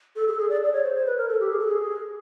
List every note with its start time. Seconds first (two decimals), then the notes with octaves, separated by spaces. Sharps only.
0.16 A4
0.28 G#4
0.32 A4
0.39 G#4
0.49 D5
0.64 D5
0.73 C#5
0.83 C5
0.96 C5
1.06 B4
1.18 A#4
1.29 A4
1.40 G4
1.51 G#4
1.59 A4
1.67 G#4